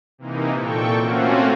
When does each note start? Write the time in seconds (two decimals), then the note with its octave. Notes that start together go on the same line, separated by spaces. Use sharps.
0.18 C3 E3 A#3 D#4
0.52 A#2 A4 G5 C#6
0.97 A3 A#3 C4 C#4 F4 F#4